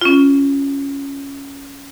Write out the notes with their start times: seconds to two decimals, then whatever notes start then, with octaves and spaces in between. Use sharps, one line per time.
0.01 C#4 F4